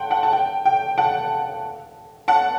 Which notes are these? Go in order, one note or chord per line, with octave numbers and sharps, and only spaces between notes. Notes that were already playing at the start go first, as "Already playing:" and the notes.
Already playing: F#5 G5 A5 C6
F#5 A5
A5
G5
G5
F#5 A5
F#5 A5